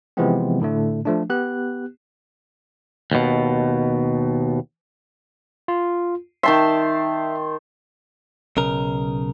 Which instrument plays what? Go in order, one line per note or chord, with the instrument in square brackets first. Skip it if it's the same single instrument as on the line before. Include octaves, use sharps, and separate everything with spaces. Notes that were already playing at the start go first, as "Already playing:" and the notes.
[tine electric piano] C3 E3 F3 G#3 B3 C4
A2 D3 A3
F3 A3 D4
B3 G4 F#6
[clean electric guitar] D#2 B2
[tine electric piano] F4
[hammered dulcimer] D#3 A5 C6 [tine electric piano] E5
[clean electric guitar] B1 C#3 A#4